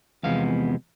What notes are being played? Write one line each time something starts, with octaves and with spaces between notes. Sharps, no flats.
E2 C3 F3 G#3 B3 F5